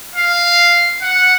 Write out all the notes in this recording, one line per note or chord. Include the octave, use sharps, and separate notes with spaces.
F5
F#5